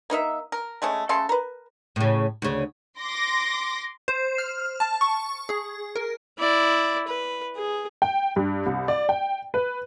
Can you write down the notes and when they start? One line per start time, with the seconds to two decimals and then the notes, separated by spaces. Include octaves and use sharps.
0.10 A#3 D#4 A#4 E5
0.52 A#4
0.82 C#3 G#3 A3 C#4
1.09 C#3 A3 A4 C6
1.29 A#4 B4
1.96 A2 C#3
2.42 D2 C#3
2.98 C6 D6 A#6
4.08 C5
4.38 F6
4.80 A5
5.01 C#6
5.49 G#4
5.96 A#4
6.38 E4 D5
7.08 B4
7.56 G#4
8.02 G5
8.36 G2
8.66 C2
8.88 D5
9.09 G5
9.54 B4